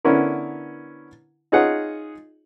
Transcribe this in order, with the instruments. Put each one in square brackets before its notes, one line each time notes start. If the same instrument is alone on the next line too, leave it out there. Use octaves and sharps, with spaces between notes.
[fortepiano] D3 B3 C#4 D4 E4 A#4
D#4 F4 G#4 C#5 F#5